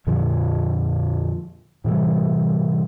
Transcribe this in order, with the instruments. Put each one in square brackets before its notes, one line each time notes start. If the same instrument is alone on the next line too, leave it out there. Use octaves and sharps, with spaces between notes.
[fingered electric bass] F2 A#2 D3 F3
A2 C3 E3 G3